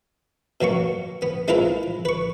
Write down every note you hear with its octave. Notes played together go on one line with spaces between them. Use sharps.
B2 F#3 A#3 C#6
B3
G#3 C4 E4 F4 A#4 B4
B4 C#6